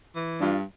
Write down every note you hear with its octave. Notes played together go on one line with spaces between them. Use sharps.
E3
G2 D4 F4